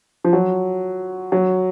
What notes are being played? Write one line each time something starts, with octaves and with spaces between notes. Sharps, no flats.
F3
F#3
F#3